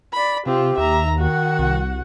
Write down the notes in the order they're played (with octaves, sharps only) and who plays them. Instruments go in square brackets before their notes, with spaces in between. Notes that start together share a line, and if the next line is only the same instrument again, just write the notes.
[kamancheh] D5 B5
[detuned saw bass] C3 [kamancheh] C4 F4 [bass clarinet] G4
[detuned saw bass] D#2 [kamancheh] E5 A#5
[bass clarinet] D#3 [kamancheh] F#4 F#5
[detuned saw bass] C2